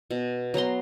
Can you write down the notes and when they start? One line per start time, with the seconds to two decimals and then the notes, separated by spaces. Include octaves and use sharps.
0.11 B2
0.54 F#3 B3 A#5 C6